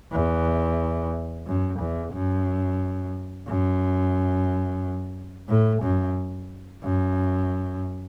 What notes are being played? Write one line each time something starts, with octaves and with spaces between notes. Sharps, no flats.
E2
F#2
E2
F#2
F#2
A2
F#2
F#2